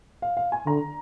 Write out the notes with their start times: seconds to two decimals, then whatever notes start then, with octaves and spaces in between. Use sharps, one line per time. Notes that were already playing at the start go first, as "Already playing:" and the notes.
0.22 F5
0.37 F5
0.52 G#5
0.66 D3 A#5